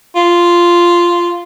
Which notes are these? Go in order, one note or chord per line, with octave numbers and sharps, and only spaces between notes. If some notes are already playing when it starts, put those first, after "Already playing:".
F4